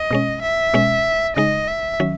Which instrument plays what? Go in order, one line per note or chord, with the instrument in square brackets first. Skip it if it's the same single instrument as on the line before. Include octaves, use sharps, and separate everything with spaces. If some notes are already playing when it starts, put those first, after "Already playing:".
Already playing: [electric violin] D#5
[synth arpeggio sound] B2 G#3 C#4
[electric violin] E5
[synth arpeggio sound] B2 G#3 C#4
[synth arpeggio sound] C#3 G#3 D#4 [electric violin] D#5
[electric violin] E5
[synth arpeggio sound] D#3 F#3 C#4